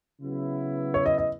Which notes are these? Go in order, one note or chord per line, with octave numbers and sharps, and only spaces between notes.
C#3 F#3 B3 E4
C#5
D#5
D#5